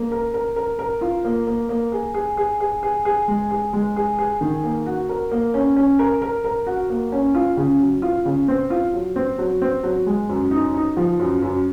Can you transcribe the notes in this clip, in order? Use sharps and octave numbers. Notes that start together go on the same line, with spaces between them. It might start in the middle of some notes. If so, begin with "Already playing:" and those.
Already playing: A#3
A#4
A#4
A#4
A#4
F4
A#3
A#3
A#3
G#4
G#4
G#4
G#4
G#4
G#4
G#3
G#4
G#3
G#4
G#4
D#3
A#3
F#4
A#4
A#3
C#4
C#4
A#4
A#4
A#4
F#4
A#3
C#4
F4
C#3
F#3
F4
C#3
C4
F4
F#3
C4
F#3
C4
F#3
G#3
F#2
D#4
D#4
F3
F#2
F#2